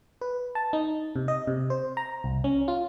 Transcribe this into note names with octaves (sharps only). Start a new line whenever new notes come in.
B4
A5
D#4
C3
D#5
C3
C5
A#5
C2
C#4
F4